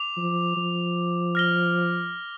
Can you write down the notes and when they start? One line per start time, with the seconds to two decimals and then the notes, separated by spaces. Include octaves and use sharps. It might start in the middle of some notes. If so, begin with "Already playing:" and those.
Already playing: D6 F7
0.17 F3
0.56 F3
1.35 F6 A#6 G7